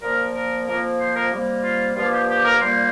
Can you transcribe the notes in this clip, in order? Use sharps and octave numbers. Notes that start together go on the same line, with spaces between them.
A#2 F3 A#3 A#4
A#4
F2 F3 A#3 A#4
C5
A#4
C3 G3 A#3
F4
G2 F3 A#3 F4
G4
G4
A#4
A#2 G3 A#3 C5